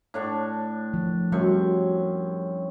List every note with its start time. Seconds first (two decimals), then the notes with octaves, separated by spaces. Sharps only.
0.14 A2 D4 C#6
0.94 F3
1.32 F#2 G3 C4 C#6